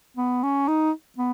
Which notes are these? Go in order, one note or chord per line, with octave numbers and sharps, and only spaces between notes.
B3
C#4
D#4
B3